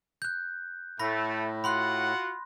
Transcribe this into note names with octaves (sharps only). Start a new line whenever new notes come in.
F#6 G6
A2 A3 B5 A#6
F4 F#4 F#5 B5 C6 F#6